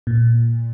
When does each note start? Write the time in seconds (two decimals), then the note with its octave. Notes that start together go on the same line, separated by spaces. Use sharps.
0.07 A#2